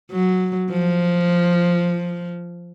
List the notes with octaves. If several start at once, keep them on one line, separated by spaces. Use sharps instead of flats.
F#3
F3